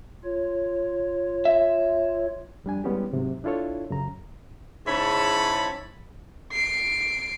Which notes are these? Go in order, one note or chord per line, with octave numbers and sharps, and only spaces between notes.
F4 C#5
E5
F2 G3 D4 G#5
G3 G#3 B3 C#4 E4 G4
G#2 C3 F#3
D4 E4 F4 A4 C#5
F#2 C#3 A#5
G#2 C#3 E4 C#5 A5 B5
C7 D7